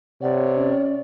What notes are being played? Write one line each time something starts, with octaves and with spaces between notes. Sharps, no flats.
C3 C#5 D5 F#5
C#4